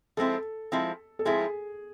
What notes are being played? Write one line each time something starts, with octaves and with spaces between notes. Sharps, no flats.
F3 G#3 C4 E4 A4
F3 G#3 C4 E4
A4
F3 G#3 C4 E4 G#4